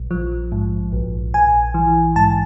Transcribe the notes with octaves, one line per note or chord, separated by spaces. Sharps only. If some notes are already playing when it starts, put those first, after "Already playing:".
Already playing: A#1
F3
G#2
A#1
A#1 G#5
E3
G#2 A5